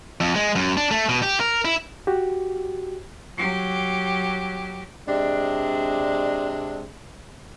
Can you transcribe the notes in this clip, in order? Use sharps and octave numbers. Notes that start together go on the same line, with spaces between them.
F2
G#3
F#2
D4
A3
B2
G4
A#4
E4
F#4 G4
F#3 G4
C3 G#3 D4